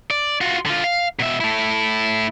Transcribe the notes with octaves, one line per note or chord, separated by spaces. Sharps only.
D5
F4 F#4
D3 F4
F5
B2 E5
A3 E4